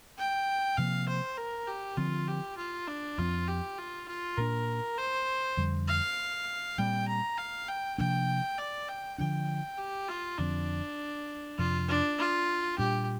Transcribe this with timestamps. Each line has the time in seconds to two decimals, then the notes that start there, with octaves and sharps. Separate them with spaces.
0.18 G5
0.77 C3 F3 A#3 F5
1.08 C5
1.37 A#4
1.68 G4
1.97 D3 F3 C4 F4
2.28 G4
2.57 F4
2.88 D4
3.18 F2 F3 C4 F4
3.48 G4
3.78 F4
4.08 F4
4.37 A#2 A#3 D4 A#4
4.98 C5
5.57 F2 D3 G3
5.88 F5
6.78 A#2 G3 C4 G5
7.08 A#5
7.38 F5
7.68 G5
7.98 C3 F3 A#3 D4 G5
8.58 D5
8.89 G5
9.18 D3 F3 D4 G5
9.78 G4
10.08 F4
10.38 F2 D3 F3 C4 D4
11.58 F2 C3 F3 F4
11.89 D4
12.18 F4
12.78 A#2 G3 D4 G4